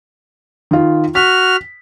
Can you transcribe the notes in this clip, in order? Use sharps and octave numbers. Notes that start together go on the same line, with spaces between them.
D#3 F4
F#4 F6 B6